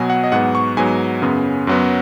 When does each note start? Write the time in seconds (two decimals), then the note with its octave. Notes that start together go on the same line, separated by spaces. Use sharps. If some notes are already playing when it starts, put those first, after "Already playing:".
Already playing: B2 F#3 B3 G#5
0.10 F#5
0.24 D#5
0.32 G#2 F#3 B3 F#5
0.55 C#6
0.77 G#2 F#3 B3 G#5
1.22 F#2 C#3 B3
1.67 F#2 F#3 B3